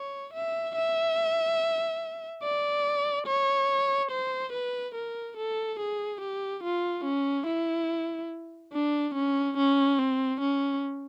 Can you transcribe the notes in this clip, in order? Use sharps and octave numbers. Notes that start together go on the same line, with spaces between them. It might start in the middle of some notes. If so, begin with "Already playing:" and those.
Already playing: C#5
E5
E5
D5
C#5
C5
B4
A#4
A4
G#4
G4
F4
C#4
E4
D4
C#4
C#4
C4
C#4